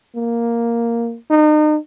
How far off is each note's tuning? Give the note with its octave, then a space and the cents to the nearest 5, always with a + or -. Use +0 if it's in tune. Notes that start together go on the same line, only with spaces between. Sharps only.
A#3 +0
D#4 -35